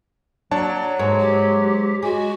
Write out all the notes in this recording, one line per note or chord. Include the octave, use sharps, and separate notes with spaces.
F#3 A#3 D4 C#5 A5
G#2 A#3 C#5
G4
G#3 F#4